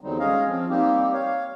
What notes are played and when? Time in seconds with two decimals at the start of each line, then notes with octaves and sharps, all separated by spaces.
0.01 E2 D3 F#3 G3 C4 D#4
0.19 G#3 C#4 G#4 C#5 D#5 F5
0.47 F3 C4
0.69 G3 A#3 C4 D#4 G4
1.13 C#5 F5